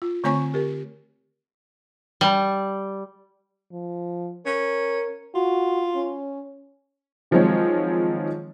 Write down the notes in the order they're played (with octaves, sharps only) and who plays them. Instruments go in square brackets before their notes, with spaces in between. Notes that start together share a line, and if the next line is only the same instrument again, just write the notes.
[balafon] F4
D3 A3 C4 C#5 G#5 C#6
G4 A#4
[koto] G3
[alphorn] F3
[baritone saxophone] C#4 [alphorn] A#4
[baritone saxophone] F4 [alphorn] F#4
[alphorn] C#4
[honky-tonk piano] D#3 F3 F#3 G#3 C4 C#5